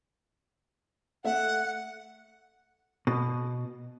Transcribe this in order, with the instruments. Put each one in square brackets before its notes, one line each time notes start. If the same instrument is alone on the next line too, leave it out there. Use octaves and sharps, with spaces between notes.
[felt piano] A3 E5 [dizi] F#5
[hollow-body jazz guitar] B2